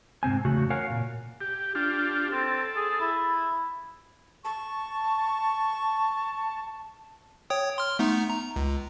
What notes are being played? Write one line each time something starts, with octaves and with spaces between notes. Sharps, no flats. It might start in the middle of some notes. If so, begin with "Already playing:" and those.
G#2 C3 C4 G#5
E2 C#3 A3 F#4
A#4 C#5 F5 F#5 G#5
A#2
G4
D4 F4 G4
C4 A4
G#4
E4
A5 C#6
C#5 G5 D#6
C6 F6
A3 B3 D#4
A#5
C#2